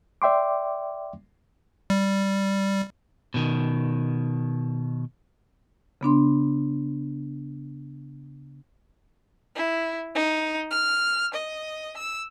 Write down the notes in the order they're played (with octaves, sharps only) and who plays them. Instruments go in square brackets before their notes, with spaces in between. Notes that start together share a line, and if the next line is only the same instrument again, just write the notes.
[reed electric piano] D5 E5 G5 C6 D6
[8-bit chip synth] G3
[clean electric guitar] B2 D#3
[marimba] C#3 B3 D4 C6
[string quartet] E4
D#4
F6
D#5
E6